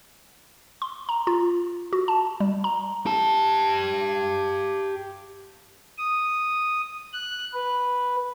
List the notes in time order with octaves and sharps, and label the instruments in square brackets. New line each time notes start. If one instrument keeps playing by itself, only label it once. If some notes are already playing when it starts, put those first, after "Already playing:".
[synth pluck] C6
A#5
F4
F#4
A5
G3
A#5
[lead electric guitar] G4 A5
[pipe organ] D#6
F#6
B4